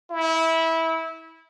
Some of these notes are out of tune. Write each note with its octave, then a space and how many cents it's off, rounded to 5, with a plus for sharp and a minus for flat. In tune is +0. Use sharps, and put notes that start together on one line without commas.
E4 -20